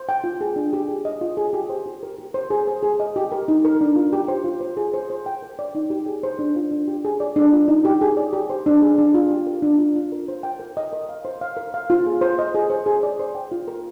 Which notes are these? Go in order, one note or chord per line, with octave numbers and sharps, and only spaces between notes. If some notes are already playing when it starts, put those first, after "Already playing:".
Already playing: C5
G5
F4
G#4
D4
G4
G#4
D#5
F4
G#4
G4
C5
G4
A#4
G4
C5
G#4
C5
G#4
D#5
G4
A#4
D#4
A#4
D4
F4
G4
C5
F4
C5
G#4
C5
C5
G5
A#4
D5
D#4
G4
G#4
C5
D4
F4
D4
G4
G#4
D5
D4
F4
D#4
G4
G#4
D5
G4
C5
D4
G#4
D4
F4
G4
A#4
D4
F4
F4
A#4
C5
G5
A#4
D#5
A#4
F5
C5
F5
A#4
F5
F4
G#4
C5
D#5
G#4
C5
G#4
D5
C5
G5
F4
A#4